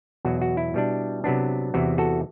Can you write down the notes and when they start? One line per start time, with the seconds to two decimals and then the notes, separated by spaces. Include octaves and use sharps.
0.25 E2 B2 F#3 F#4
0.41 F#4
0.57 E4
0.74 B2 G3 D4
1.24 C3 F#3 B3 D4
1.74 E2 C3 E3 F#4
1.98 F#4 A4